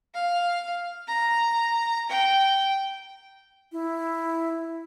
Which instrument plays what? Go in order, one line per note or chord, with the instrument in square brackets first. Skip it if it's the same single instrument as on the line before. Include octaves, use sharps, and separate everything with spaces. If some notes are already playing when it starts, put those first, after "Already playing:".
[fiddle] F5
A#5
G5
[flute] E4